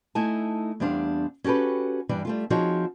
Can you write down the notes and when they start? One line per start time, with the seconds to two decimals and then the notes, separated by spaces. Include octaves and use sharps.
0.15 A3 D#4 E4 G#5 A5
0.80 E2 G3 C4 D4 F5
1.44 C#4 F#4 G4 A4 B4
2.09 G2 E3 G3 D5
2.25 G3 A3 F4
2.50 F3 C4 D#4 F#4 G#4 C#5